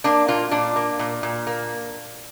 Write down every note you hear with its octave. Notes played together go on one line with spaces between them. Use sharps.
A#3 D4
A#2 F4
A#2 D4
A#3
A#2
A#2
A#3